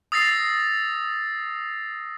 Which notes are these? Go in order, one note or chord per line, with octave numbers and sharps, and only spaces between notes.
D#6 E6 A6 A#6 C7